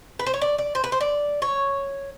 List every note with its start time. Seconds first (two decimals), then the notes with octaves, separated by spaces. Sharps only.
0.19 B4
0.26 C5
0.34 C#5
0.42 D5
0.58 D5
0.75 C5
0.84 B4
0.92 C5
1.01 D5
1.42 C#5